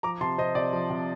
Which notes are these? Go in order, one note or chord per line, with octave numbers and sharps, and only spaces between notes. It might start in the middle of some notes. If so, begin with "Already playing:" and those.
F3 A#5 D6
C3 A5 C6
C3 C5 D#5
C3 D5
F3
C3